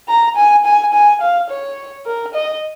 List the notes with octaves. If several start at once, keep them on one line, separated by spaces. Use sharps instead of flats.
A#5
G#5
G#5
G#5
F5
C#5
A#4
D#5